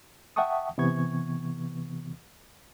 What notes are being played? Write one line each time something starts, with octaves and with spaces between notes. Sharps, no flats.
E5 F#5 G5 A5 C#6 D#6
C3 E3 B3 C#6 G#6